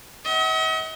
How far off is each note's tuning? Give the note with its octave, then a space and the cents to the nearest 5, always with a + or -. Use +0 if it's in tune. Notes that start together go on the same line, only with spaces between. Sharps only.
D#5 +45 F#5 +25